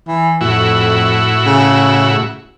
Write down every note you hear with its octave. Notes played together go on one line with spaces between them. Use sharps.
E3
F2 A2 E4 F#4
C#3